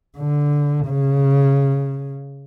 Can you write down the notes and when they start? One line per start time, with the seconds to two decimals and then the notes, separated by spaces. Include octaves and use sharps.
0.18 D3
0.87 C#3